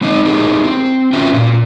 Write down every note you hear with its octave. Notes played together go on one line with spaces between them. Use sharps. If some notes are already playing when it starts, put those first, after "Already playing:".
G#3 C4 D#4 D#5
D#4 E4 G4 G#4 A#4
C4
C#4 F4 F#4 B4 E5 G5
A#2 A#3